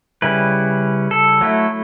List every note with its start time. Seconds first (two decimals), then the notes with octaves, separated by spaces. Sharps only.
0.22 C#3 G3 C#4 E4 B4
1.11 A4
1.41 F#3 A3 E4